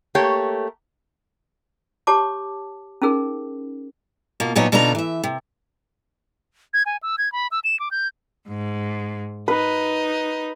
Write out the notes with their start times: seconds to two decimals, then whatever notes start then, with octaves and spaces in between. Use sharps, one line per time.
0.15 A3 A#3 G4 C#5
2.07 G4 C#5 A5 D6
3.02 C#4 D#4 G#4 A#4
4.40 B2 A#3 F4
4.55 A#2 F#3 B3 D4 D#4 C#5
4.72 B2 D3 D4 D#4 F4 A#5
4.95 E3 E5
5.24 C3
6.74 G#6
6.86 G#5
7.03 E6
7.18 G#6
7.32 B5
7.51 E6
7.64 E7
7.80 D6
7.91 G6
8.48 G#2
9.48 D#4 B4